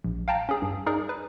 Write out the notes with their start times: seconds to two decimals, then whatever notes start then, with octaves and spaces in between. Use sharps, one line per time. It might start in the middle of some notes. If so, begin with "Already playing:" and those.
0.04 A#1
0.28 F5 G5 A5 A#5
0.49 C#4 G#4
0.62 G2
0.86 D#4 G#4 A#4 D5
1.09 B4